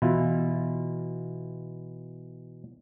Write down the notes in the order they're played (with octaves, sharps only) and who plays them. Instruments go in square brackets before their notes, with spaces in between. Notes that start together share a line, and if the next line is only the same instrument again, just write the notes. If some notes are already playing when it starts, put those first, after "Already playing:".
[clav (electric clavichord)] B2 E3 E4 F4